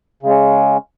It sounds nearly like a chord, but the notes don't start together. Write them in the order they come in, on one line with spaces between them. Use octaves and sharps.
C#3 G#3 C#4